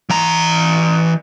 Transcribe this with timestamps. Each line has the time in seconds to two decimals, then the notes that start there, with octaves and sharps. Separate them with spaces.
0.10 E3 A#5